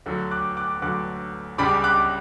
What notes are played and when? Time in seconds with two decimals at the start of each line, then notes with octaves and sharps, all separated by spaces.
0.06 D2 D3 F#3
0.31 D6 F#6
0.57 D6 F#6
0.82 D2 D3 F#3 D6 F#6
1.58 C#2 C#3 G3 D4 B5 D6
1.84 D6 F#6